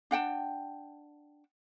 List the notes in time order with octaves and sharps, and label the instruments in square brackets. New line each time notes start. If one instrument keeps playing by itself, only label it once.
[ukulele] D4 F#5 G5 A5